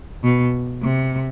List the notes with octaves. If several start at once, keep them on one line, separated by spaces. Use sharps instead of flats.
B2
C3